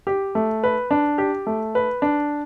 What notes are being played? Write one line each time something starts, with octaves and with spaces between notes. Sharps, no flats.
G4
A3
B4
D4
G4
A3
B4
D4